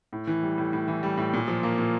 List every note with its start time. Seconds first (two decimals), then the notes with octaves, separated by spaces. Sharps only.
0.13 A2
0.27 E3
0.43 G3
0.58 A2
0.73 A2
0.88 E3
1.03 G3
1.17 A2
1.33 A#2
1.48 F3
1.63 A#3
1.78 A#2